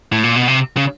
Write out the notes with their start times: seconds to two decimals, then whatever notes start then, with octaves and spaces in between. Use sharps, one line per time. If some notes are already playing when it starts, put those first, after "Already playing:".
0.12 A2
0.24 A#2
0.36 B2
0.48 C3
0.77 C#3